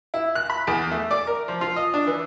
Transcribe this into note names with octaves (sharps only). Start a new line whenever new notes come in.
E4
F#6
B5
E2
A3
D5
A#4
F3
F4
D#5
D4
E3